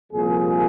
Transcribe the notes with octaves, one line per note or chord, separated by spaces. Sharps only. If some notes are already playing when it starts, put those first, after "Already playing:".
C2 A#2 F3 G#4